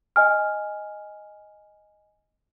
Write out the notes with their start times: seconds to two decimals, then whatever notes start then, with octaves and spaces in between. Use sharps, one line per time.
0.16 D#5 G#5 F6